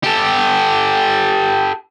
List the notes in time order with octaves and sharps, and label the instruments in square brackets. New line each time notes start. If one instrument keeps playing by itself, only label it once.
[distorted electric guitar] G4 A4